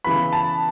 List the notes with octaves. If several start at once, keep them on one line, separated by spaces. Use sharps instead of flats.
C#3 E3 B3 B5
A5